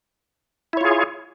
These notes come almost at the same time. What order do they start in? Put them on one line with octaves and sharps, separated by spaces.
E4 C#5 F4 G#4